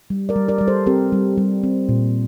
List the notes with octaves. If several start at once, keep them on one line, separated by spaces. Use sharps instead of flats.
G3
A#4 D5
G3
A#4 D5
G3 D5
A4 C5
C4 G4 A#4
G3
G3
C4
A#2